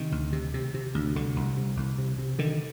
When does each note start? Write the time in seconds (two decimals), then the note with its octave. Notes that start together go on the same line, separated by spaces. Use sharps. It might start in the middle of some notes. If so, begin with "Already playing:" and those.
Already playing: C3 D#3
0.12 D2
0.33 C3
0.54 C3
0.74 C3
0.95 D2
1.16 C2 D3
1.36 C2
1.57 C3
1.77 C2
1.98 C3
2.18 C3
2.39 D3 D#3